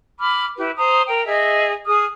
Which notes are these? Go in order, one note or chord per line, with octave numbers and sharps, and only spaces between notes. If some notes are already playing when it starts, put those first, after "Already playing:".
B5 D6 F6
E4 G4 B4
C5 A#5 D#6
A#4 G5
G#4 D#5 E5
G#4 D#6 F6